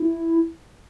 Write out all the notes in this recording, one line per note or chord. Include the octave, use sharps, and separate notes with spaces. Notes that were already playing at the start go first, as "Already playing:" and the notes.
Already playing: E4